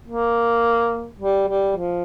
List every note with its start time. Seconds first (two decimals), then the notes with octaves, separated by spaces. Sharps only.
0.08 A#3
1.19 G3
1.48 G3
1.76 F3